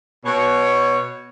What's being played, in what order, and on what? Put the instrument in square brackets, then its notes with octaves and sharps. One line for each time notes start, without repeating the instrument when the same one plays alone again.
[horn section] B2 C#5